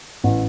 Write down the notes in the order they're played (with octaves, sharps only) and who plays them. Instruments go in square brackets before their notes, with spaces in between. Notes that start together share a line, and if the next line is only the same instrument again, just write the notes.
[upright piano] A1